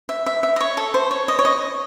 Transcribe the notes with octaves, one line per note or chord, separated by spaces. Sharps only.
E5
E5
E5
D#5
C#5
A4
C5
C#5
D#5
C#5
D#5